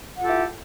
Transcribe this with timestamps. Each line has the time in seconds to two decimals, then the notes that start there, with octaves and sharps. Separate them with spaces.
0.17 F#5
0.20 F4
0.23 A4
0.26 G4
0.29 E4